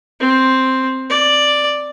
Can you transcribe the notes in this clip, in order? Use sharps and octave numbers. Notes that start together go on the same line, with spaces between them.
C4
D5